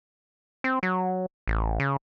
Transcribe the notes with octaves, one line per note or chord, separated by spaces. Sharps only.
C4
F#3
A1
C#3